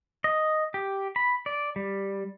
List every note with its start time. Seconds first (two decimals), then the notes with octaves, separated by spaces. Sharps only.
0.24 D#5
0.74 G4
1.16 B5
1.46 D5
1.76 G3